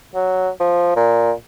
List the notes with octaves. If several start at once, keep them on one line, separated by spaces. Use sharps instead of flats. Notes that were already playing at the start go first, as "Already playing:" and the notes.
F#3
F3
A#2